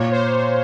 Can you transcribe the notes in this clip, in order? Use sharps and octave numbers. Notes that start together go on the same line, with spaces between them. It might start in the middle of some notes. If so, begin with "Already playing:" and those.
Already playing: A#2 C#5
C5